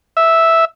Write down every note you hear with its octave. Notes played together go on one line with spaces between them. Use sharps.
E5